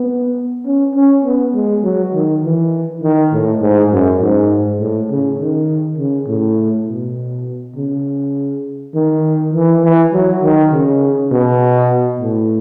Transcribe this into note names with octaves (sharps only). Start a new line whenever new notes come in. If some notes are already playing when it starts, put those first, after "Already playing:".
Already playing: B3
C#4
C#4
B3
G#3
F#3
D#3
E3
D#3
A2
G#2
F#2
G#2
A2
C#3
D#3
C#3
A2
B2
C#3
D#3
E3
E3
F#3
D#3
C#3
B2
A2